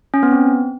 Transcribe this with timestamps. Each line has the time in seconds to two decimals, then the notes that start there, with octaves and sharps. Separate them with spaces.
0.14 C#4
0.23 B3
0.32 C4